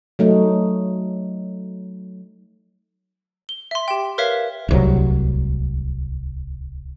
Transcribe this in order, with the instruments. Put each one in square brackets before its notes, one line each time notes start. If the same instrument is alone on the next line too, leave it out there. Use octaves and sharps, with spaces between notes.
[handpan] F#3 A3 D#4
[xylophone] G7
E5 C6
G4 G5
A#4 B4 C#5 E5 F5
[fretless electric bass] D1 C2 F#3